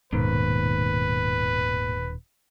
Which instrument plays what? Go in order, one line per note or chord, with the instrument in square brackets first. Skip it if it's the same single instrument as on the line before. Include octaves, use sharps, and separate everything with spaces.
[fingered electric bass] D#1 B2 D#3 [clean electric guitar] D#2 G#2 [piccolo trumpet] B4